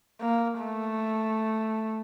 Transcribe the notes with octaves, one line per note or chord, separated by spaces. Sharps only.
A#3
A3